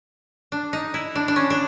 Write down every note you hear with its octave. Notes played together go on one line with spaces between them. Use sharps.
D4
D#4
E4
D4
D4
C#4
D4